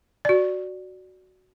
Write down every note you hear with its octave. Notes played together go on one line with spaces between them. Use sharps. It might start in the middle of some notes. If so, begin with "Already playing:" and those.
F#4 D5